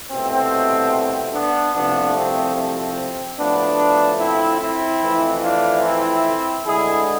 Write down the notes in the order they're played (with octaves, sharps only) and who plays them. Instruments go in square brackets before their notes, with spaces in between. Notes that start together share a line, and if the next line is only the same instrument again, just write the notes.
[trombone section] C2 B2 A3 C4
B3 D4
C2 C3 F3 A3 B3 D4
C4
C4
A2 F3 A3 B3 D4
C4 E4
C4 E4
F2 E3 A3
D4 F4
C4 E4
D2 D3 G#3 E4 G#4